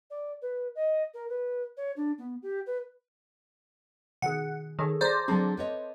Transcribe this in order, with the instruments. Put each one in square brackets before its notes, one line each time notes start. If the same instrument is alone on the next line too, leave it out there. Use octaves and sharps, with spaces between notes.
[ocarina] D5
B4
D#5
A#4
B4
C#5
D4
B3
G4
B4
[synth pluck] B2 D#3 G#4 [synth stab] F#5
[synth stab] D#3 [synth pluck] G#4 A4 C#5
[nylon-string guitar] G#4 A5 [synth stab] C5 D5 [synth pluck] A#5 A#6
[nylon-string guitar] D3 F#3 G#4 [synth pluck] C4 A5 A6
[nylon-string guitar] B4 C#5 D#5